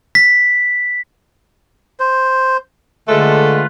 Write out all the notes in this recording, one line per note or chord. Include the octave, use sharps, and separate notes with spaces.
B6
C5
D3 G#3 A3 F4 A4 B4